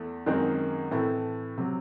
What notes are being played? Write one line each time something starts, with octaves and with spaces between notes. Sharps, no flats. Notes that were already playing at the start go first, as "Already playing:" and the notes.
Already playing: E2 A3
F#2 D#3 G#3 C4 D#4
A2 E3 A3 C4 E4
C3 F#3